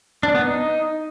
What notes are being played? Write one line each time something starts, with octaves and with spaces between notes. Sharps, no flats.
D4
B3
D#4